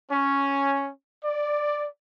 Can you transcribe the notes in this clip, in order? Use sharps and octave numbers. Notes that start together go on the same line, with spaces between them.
C#4
D5